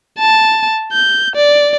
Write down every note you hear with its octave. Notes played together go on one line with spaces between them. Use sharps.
A5
G6
D5